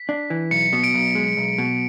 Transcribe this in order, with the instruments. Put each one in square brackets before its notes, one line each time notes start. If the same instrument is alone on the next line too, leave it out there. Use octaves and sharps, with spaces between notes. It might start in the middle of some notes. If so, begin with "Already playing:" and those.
Already playing: [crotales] B6
[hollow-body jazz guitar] D4
E3
[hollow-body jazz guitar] B1 [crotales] C#7
[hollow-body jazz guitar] B2
[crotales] D7
[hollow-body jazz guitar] B1
G#3
B1
B2